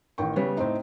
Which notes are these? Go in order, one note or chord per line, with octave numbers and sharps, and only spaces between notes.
A1 D#3 G5 C#6
C#3 G3 B3 C#5
A2 C4 D#4